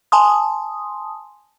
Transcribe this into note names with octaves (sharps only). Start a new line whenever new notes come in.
G#5 A5 C6 D#6